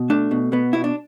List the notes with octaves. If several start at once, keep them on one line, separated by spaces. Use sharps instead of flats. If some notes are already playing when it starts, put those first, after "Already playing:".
Already playing: B2
A3 D4
B2
B2 B3
B2 E4
D4